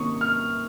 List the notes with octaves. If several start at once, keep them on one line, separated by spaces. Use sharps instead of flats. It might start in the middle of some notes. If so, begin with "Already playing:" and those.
Already playing: C3 D#3 A#3 C#4 C#6 D#6
F6